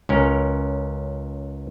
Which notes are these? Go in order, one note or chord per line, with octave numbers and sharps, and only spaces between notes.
C#2 C#4 A#4